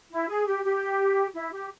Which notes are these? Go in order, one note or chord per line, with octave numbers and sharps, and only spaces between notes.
E4
G#4
G4
G4
E4
G4